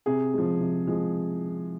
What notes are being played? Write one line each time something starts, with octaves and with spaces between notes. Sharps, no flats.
C3 G#4
F3 G#3
C3
F3 G#3